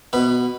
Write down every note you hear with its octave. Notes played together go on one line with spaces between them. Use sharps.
B2 B4